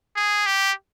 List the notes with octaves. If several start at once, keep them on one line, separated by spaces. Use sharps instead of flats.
G#4
G4